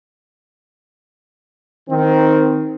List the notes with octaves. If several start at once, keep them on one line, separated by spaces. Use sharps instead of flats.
D#3 C4